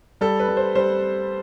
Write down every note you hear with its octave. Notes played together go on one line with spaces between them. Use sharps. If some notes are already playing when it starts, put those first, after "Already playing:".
G3 A4
B4
G3
C5
G3 C5